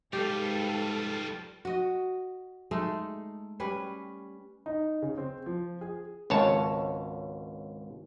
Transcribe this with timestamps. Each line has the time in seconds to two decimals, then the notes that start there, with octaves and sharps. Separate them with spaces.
0.13 G#2 G3 F4 G4 A4 B4
1.65 F#4 D#5
2.71 G#3 A3 D#4 A4
3.60 G3 C#4 B4
4.66 D#4
5.02 C#3
5.18 C4
5.46 F3
5.81 G#4
6.30 G#1 C#2 C#5 A5